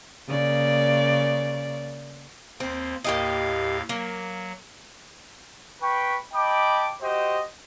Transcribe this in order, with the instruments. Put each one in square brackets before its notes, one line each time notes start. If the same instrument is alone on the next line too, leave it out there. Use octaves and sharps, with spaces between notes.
[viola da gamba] C#3 A#3 D5
[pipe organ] D#2 A#3 [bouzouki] C4
[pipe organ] D#2 A2 F5 [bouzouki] A#3 G4 D#5
[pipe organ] F#3 [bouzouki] A#3
[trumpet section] B4 G5 B5 C#6
D#5 G5 A5 B5 D6
F#4 G4 C5 D#5